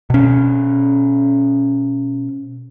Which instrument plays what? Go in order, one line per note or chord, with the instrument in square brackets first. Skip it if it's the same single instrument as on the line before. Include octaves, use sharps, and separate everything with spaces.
[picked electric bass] B2 C#4